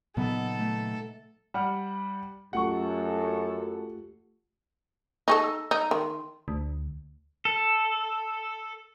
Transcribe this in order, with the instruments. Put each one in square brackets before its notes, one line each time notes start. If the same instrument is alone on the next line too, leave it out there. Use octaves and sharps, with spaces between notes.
[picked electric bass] A#2 C#3 F#3 [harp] B3 D#4 [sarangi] A4
[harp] A3
[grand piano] G3 F#5 F6
[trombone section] F#2 A4 [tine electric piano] A3 F4 G4 [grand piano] F#5 C#6
[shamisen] D#4 G#4 A4 [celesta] C#6 A#6
[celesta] E6
[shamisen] D#4
[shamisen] D#3 [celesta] C6
[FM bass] D2
[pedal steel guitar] A4